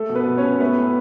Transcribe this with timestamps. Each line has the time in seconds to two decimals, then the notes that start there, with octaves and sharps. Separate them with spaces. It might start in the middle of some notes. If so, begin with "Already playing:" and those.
Already playing: A3 A4
0.09 B2
0.15 B3 B4
0.27 B2
0.38 C#4 C#5
0.44 B2
0.60 A3 B3 B4
0.78 A2